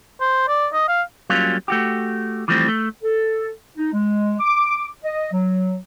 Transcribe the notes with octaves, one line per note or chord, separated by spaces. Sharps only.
C5
D5
D#5
F5
F#3 G3 A#3 C#4 F4
A3 F#4 G4
E3 F3 G3 A3 C4
A3
A4
D#4
G#3
D6
D#5
F#3